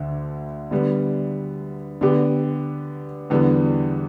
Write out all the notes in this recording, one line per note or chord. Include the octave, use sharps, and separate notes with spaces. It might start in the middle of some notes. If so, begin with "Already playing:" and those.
Already playing: D2 D3
D3 G3 B3
D3 B3 G4
E2 D3 G3 B3